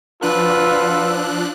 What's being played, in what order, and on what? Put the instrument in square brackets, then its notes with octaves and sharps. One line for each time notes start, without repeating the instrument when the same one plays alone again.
[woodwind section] B2 F#5 E6 [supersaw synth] F3 D4 F#6 [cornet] F4 [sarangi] B4